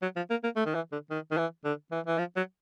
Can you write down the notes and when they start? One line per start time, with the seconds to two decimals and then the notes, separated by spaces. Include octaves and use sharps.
0.02 F#3
0.16 F3
0.30 A#3
0.44 A#3
0.56 A3
0.66 D#3
0.75 E3
0.92 D3
1.10 D#3
1.31 D#3
1.38 E3
1.64 D3
1.92 E3
2.07 E3
2.18 F3
2.36 F#3